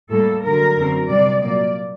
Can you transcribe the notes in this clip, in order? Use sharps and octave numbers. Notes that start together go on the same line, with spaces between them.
A2 G3 A#3 A4
G2 D3 F#3 A#4
F#2 D3 F#3 C4
C3 G3 C4 D5
A#2 F#3 A#3 D5